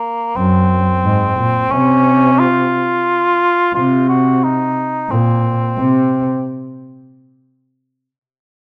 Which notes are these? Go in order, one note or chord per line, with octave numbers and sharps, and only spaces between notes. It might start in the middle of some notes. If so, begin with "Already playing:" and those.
Already playing: A#3
F#2 C4
G#2
A#2
C3 C#4
F4
C3 F4
F#4
D#4
A#2 C4
C3